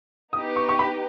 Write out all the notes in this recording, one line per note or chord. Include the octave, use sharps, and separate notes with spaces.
B3 D#4 G4 B4 D#6
C#6
C#6
B5